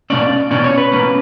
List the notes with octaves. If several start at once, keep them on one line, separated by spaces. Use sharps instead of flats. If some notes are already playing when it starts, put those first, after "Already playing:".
B2 A#3 C#4 D5
B2 A#3 C#4 D5
C#5
B4
B2 A#3 C#4